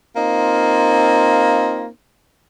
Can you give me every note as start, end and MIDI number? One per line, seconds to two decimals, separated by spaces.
0.16 1.88 58
0.16 1.88 60
0.16 1.88 63
0.16 1.88 65